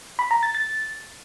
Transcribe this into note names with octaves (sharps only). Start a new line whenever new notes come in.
B5
A#5
A6
A6